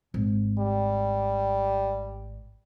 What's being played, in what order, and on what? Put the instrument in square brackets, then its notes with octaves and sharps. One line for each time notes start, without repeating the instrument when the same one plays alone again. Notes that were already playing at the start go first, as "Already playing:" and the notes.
[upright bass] G#1
[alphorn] G3